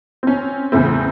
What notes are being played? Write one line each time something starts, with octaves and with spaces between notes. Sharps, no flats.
C4 C#4
E2 A2 C#3 A3 C4